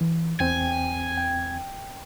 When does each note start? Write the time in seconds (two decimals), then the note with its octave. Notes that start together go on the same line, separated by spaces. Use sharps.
0.01 E3
0.40 E2 C4 G5 G#5
1.17 G5